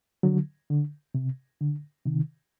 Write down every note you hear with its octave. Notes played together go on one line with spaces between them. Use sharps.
D3 F#3
D3
C3
D3
C3 D#3